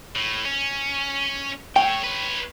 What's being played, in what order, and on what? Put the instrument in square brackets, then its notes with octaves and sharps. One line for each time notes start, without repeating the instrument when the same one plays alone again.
[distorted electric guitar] A2
C#4
[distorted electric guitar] A3 C#5 [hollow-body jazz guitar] G5
[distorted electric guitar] B4 C#5